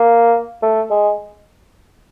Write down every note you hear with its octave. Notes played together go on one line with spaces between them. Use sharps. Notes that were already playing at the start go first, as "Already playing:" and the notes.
Already playing: A#3
A3
G#3